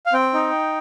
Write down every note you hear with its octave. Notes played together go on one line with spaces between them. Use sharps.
F5
C4 G5
D#4